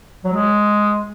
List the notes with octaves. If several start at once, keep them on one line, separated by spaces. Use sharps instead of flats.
F#3
G#3